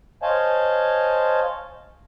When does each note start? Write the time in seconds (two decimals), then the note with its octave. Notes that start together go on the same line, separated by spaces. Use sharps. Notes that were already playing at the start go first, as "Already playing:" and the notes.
0.23 C5 C#5 D#5 F5 G#5 A5